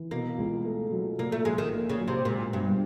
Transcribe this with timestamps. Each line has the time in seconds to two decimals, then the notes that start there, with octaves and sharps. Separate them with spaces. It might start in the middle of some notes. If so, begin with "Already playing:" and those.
Already playing: E3
0.11 B2 A#3
0.38 C#2
0.65 A3
0.92 F#3
1.19 A#2 A#3
1.32 A3
1.45 A#1 G#3
1.58 D#3
1.72 A#3
1.90 C#3
1.99 F#3
2.08 C3
2.25 A#2 G#3
2.53 G2 B2